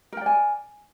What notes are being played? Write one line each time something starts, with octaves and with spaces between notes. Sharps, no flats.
A#4 D5 G5 G#5